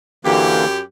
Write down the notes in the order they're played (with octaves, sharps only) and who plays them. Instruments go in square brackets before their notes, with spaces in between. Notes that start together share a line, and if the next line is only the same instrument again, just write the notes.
[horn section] F#2 G4 [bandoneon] D3 E3 A#3